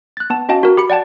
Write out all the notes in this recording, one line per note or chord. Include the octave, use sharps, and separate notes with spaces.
F#6 A6
B3 A5
C#4 F#4 D#5 F5 G5 A5
F#4 A#4
G4 B5 C#7
D5 F#5 G5 A5 A6